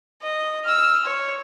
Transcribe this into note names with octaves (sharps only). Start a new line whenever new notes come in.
D#5
E6 F6
C#5